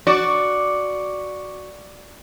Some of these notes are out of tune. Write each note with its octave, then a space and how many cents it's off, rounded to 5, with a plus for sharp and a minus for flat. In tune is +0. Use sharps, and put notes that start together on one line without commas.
F#4 +0 D5 +0